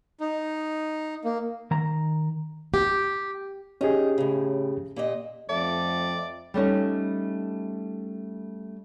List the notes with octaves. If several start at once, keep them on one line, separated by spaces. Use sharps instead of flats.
D#4
A#3
D#3 A#5
G4
C#4 D#4 G4 G#4
A2 C#3
A#2 G4 D#5
F2 A3 D5
G3 A3 C#4 D#4